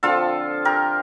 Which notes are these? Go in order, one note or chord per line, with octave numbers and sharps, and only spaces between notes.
D3 F3 C4 F4 A4
G4 A#4